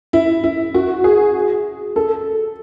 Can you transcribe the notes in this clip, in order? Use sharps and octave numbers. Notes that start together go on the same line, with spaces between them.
E4
E4
F#4
G#4
A4